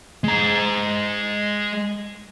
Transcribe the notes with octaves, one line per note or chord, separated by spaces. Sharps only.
G#3 A#5